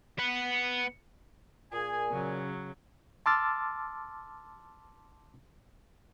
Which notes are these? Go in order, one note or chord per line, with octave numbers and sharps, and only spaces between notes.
B3 F#5
A#2 G#4 G#5
C#3 F#3
A5 C6 D6 E6 F6 A6